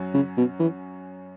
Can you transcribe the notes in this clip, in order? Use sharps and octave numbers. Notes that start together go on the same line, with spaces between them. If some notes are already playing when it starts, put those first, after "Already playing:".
Already playing: F#2 F#3 C#4 F#4
C#3
B2
E3